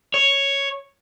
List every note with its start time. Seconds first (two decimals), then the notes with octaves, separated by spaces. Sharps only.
0.14 C#5